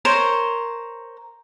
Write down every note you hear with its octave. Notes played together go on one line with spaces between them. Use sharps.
A#4 C5 C#5